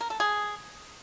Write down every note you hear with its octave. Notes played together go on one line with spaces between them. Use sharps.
A#4
A4
G#4